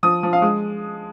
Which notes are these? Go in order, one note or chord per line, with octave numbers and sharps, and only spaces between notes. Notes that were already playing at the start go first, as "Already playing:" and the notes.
F3 D#6
F3
F5
G#3